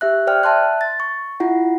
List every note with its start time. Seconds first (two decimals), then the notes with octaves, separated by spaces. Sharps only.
0.01 G4 E5 F#6
0.27 C5 D5 G5 F6
0.43 E5 A5 C6 F#6
0.81 A6
1.00 C#6
1.40 E4 F4 F#5